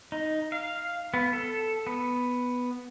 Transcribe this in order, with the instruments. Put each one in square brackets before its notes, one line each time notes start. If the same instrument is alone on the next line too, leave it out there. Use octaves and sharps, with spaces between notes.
[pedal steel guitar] D#4
F5
B3
A4
B3